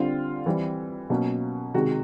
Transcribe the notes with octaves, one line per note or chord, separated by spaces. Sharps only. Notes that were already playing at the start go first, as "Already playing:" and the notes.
Already playing: D3 G3 C4 F4
E3 G3 C4
B2 F#3 A#3 C#4
C3 D#3 G#3 F#4